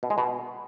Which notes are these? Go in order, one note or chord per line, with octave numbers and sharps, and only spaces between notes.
B2
G#3
B2